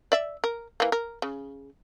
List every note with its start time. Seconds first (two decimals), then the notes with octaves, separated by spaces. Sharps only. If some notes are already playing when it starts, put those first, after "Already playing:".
0.12 D5 E5
0.44 A#4
0.80 E3 A#3
0.92 A#4
1.22 C#3